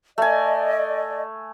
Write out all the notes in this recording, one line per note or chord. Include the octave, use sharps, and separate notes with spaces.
A3 D5 D#5 G#5